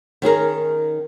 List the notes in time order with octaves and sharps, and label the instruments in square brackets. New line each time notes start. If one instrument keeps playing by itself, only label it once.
[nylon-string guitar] D#3 C#4 G#4 A#4